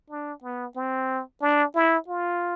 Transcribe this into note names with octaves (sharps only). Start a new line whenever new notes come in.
D4
B3
C4
D4
E4
F4